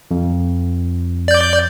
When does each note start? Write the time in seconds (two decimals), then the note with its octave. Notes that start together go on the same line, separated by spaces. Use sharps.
0.11 F2
1.28 D5 G6